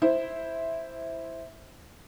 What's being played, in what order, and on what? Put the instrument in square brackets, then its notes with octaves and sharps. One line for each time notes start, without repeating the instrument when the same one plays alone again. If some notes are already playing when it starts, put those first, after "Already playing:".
[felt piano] E4 C5